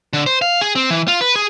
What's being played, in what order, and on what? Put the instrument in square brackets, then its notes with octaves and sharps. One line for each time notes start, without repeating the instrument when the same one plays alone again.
[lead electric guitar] D3
C5
F5
G#4
C4
E3
F4
B4
G#4